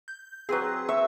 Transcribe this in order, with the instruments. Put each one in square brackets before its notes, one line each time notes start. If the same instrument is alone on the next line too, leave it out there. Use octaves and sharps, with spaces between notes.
[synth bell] G6
[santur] F#3 C4 [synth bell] G#4 B4
[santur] E5 C#6 E6